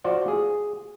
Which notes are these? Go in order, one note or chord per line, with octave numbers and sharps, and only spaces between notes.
F4 F#4 C5 D5
G#4